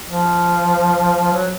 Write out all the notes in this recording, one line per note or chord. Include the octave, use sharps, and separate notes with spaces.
F3
F#3